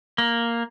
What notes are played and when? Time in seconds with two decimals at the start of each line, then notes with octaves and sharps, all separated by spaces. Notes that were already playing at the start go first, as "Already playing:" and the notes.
0.18 A#3